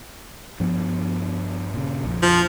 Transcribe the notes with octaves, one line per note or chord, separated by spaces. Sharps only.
G2 F3 B3
A#2 C#3
A#1 F2
F3